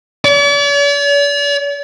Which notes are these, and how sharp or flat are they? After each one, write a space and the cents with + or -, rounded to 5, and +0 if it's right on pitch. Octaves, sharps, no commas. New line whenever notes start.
D5 -45